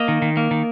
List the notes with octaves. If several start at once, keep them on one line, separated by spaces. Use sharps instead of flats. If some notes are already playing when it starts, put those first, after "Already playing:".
Already playing: A#3 D#5
D#3
D#3
A#3
D#3